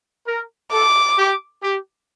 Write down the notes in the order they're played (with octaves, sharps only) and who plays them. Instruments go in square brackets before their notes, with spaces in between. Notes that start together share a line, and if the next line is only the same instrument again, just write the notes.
[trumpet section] A#4
[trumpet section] A4 [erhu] D6
[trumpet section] G4
G4